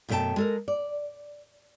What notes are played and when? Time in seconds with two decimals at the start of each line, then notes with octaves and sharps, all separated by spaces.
0.09 F#2 B2 A3 G4 G5 A5
0.36 G#3 A4 A#4
0.68 D5